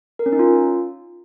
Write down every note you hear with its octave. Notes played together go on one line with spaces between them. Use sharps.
A#4
C#4
D#4
F4